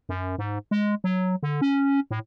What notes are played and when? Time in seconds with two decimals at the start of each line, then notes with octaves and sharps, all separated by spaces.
0.09 F#2
0.38 G#2
0.71 G#3
1.04 F#3
1.43 D3
1.61 C#4
2.11 A2